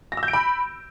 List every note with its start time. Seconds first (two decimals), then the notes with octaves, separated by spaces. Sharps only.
0.12 A#6
0.17 E6
0.23 G6
0.28 D7
0.33 B5